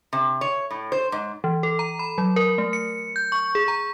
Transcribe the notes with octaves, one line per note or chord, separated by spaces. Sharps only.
C3
C#5
A2
C5
G#2
E3
A4
A#5
B5
F#3
A#4
A3
C#7
G6
C#6
G#4
A#5